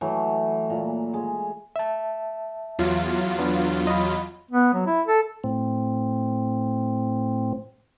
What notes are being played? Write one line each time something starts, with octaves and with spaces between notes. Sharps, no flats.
E3 F#3 A3
A#2
G#3
E5 A5
E2 F#3 F4
B3 D4
D#5 B5
B3
F#3
E4
A4
A2 C4